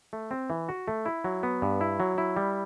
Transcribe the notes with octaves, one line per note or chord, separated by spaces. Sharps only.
A3
C4
E3
F#4
A3
E4
F#3
B3
G2
E4
F#3
E4
G3